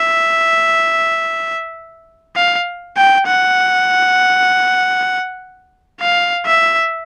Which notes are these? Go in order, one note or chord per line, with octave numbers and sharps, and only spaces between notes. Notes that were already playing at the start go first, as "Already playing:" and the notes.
Already playing: E5
F5
G5
F#5
F5
E5